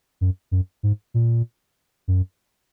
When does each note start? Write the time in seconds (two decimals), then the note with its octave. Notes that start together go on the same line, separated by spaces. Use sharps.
0.21 F#2
0.51 F#2
0.83 G#2
1.14 A#2
2.08 F#2